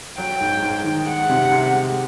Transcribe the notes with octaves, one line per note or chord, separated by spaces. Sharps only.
F#3 G5
G#2
G#2
D#3
G#3 F#5
C3
C3
G#3